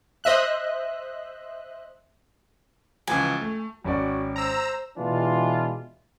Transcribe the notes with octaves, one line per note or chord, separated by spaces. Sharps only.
C5 D#5 E5 F#6
C#2 E3 F3 G#5
A3
G#1 C#4 F#4 D5
C5 A#5 E6
B2 E3 G#3 D4 F4